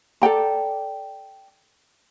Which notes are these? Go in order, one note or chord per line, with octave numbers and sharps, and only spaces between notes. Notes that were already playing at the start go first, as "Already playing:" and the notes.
A4 D5 G5 A#5